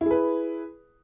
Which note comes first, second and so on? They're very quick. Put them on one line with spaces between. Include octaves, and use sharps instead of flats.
E4 G#4 B4